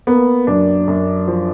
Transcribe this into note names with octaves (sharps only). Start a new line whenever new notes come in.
A#3 B3
F#2 D4
F#2
F3